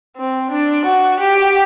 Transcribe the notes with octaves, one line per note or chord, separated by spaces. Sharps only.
C4
D4
F#4
G4